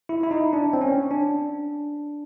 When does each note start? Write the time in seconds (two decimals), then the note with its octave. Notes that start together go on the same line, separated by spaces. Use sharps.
0.09 E4
0.23 E4
0.31 D#4
0.53 D4
0.73 C4
0.81 C#4
1.11 D4